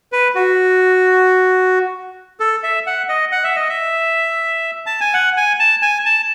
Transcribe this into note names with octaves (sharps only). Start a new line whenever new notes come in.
B4
F#4
A4
E5
F#5
D#5
F#5
E5
D#5
E5
A5
G#5
F#5
G#5
A5
G#5
A5